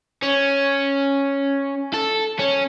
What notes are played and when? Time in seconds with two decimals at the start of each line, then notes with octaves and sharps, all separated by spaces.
0.22 C#4
1.94 A4
2.39 C#4